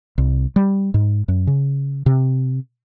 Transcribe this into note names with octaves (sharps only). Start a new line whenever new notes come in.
C2
G3
G#2
F#2
C#3
C3